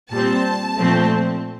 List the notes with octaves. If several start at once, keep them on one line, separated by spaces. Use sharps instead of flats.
A#2 G3 C4 A5
A#2 F3 A3 C4